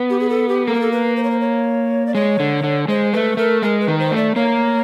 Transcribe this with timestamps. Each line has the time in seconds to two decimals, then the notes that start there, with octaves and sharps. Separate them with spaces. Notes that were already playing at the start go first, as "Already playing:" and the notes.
Already playing: B3
0.10 G4
0.20 G#4
0.30 A4
0.49 G4
0.67 A#3 A4
0.74 A#4
0.81 A4
0.92 B4
1.17 C5
1.24 C#5
1.31 C5
1.41 C#5
2.07 D5
2.15 G#3 C#5
2.40 D3
2.64 D3
2.88 G#3 C5
3.13 A3 B4
3.37 A3 A#4
3.62 G#3 A#4
3.81 B4
3.87 D#3
3.99 C5
4.12 A3
4.17 D5
4.36 A#3 C#5